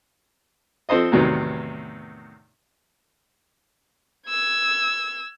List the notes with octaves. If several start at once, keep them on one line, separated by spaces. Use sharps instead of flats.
F3 C4 A4 C5 D#5
E2 A2 C3 D#3 F#3 B3
E6 G#6